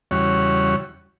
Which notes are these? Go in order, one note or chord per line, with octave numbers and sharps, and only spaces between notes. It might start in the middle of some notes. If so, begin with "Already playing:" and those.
E2 C#3 G3 F#4 C#5